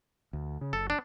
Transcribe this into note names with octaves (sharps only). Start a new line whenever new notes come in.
D2
C#3
F#1 A4
D4